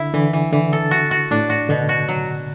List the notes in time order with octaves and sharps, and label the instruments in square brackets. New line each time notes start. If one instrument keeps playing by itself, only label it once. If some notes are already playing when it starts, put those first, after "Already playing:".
Already playing: [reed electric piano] D3 [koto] E4
[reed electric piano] D3 [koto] E3
[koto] E3
[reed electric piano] D3 [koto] E3
[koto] A4
F#4
F#4
[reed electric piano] A2 [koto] D4
[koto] F#4
[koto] B2 [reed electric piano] D3
[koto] F#4
F#3